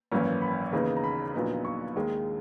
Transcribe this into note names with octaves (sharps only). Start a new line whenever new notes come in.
G#1 F#2 E3 A#3 C#4
B5
D#2 C#3 E3 B3 D#4
A#5
B5
A#1 A#2 F#3 B3 D#4
C#6
D#2 D#3 G#3